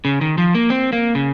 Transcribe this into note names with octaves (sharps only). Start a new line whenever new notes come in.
C#3
D#3
F3
A#3
C4
A#3
C#3